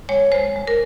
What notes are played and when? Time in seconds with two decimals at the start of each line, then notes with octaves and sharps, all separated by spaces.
0.09 G#3 C#5
0.32 G#3 C5
0.56 G#3
0.67 A#4